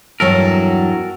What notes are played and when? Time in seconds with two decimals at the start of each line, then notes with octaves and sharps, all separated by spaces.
0.20 E2 G2 F#3 F#4 A4 A#4